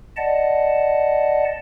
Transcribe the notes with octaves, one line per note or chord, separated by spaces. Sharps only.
D5 D#5 F#5 A5